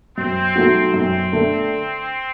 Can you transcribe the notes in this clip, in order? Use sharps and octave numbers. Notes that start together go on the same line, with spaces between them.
F#2 C4
F#3 A3 D#4 F#4
F#2 C4
D3 A3